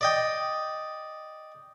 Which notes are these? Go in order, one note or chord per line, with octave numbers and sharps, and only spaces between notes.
D5 D#5 G5